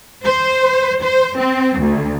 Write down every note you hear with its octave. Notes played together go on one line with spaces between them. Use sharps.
C5
C5
C4
D2